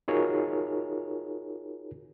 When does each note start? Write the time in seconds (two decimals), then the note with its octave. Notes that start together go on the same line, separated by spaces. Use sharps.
0.08 D#4 F4 F#4 G#4 A#4 C#5